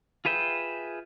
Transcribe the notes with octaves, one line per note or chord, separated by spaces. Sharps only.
F4 G#4 B4 E5 G5